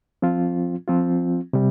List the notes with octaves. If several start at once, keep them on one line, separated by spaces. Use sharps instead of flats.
F3 C4 F4
F3 C4 F4
C3 G3